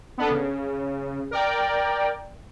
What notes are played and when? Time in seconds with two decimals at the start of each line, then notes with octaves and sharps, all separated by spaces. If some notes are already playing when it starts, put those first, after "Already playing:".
0.18 B3 D4 A4
0.31 C#3
1.31 A#4 D5 G5